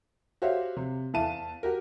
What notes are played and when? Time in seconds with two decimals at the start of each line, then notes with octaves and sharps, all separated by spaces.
0.42 F#4 G4 C5 C#5 E5 F5
0.76 C3
1.13 E2 E3 E5 F5 A5 D#7
1.63 F#4 G4 A#4